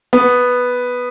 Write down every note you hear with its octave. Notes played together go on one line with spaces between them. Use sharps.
B3